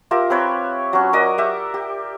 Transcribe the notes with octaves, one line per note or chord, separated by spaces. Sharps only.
F4 G4 A#4 E5
C4 B4 C#5 G5
F#3 C#4
F#4 A#4 D5 D#5
G4 E5 F#5
G4